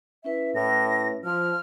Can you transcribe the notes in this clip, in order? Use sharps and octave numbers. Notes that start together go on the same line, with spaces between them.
C#4 E4 B4 E5
A2 A#6
F3 F6